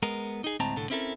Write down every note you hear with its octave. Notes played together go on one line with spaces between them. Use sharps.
G#3 B3 A#4
D#4 G#4
D2 A2 G#3 C4 A5 A#5
C2 A2 D3 A4
C4 C#4 E4 G4 A4 A#4